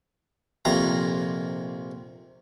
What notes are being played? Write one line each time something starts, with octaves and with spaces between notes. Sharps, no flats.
A#1 F2 C3 F5 A#5